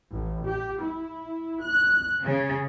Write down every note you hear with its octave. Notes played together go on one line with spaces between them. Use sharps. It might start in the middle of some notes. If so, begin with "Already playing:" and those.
A1
G4
E4
F#6
C#3